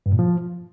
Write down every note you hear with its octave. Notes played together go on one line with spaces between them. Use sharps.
G2
A#2
F3